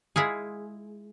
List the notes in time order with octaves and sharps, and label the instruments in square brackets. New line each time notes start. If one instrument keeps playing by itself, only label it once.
[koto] G#3 E4 F4 G#4